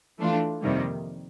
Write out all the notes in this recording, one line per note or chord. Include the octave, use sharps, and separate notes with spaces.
E3 A3 D4 F4
F2 C3 D#3 G3 A#3